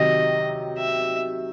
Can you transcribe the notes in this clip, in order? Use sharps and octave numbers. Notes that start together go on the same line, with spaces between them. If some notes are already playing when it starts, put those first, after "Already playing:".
Already playing: C3 D#3 F#3 D#5
E5